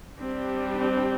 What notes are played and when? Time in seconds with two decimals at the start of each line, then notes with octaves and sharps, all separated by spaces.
0.19 G3 C4 D4 G4
0.77 C4